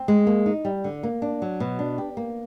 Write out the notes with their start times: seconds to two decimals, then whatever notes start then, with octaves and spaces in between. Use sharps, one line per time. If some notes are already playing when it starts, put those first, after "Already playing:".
Already playing: C4
0.08 G#3
0.27 A#3
0.46 D#4
0.65 G3
0.84 D3
1.03 A#3
1.22 D4
1.42 F#3
1.60 B2
1.79 D4
1.98 G4
2.17 A#3